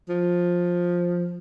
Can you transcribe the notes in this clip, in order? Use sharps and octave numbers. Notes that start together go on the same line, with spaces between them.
F3